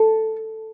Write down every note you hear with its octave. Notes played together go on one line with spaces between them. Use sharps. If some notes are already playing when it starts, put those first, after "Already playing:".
Already playing: A4